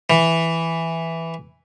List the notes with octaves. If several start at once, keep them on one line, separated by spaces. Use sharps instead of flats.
E3